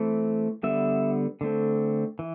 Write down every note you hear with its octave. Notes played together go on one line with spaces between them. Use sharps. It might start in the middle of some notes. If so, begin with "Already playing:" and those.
Already playing: E3 A3 C4
D3 G3 B3 E5
D3 A3 C4
E3